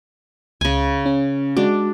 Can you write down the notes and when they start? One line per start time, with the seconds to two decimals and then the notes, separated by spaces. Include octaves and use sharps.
0.61 C#2 C#3 G#5
1.06 C#4
1.57 G#3 D4 F#4